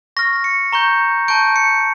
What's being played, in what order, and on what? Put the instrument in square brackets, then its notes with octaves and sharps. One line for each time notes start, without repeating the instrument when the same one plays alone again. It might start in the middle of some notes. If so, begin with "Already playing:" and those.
[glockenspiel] C#6 F6 A#6
C#7
A#5 C#6 G6
A5 C#6 G6 D7
C#7